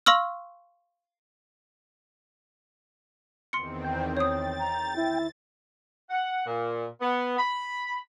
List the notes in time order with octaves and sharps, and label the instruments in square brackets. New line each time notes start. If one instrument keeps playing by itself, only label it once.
[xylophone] F5 C6 C#6 E6 F6
[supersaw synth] E2 D#3 C4 [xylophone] C6 C#7
[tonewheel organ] G5
[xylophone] C#5 D#6 [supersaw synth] A6
[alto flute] A#5
E4
[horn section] F#5
A#2
B3
B5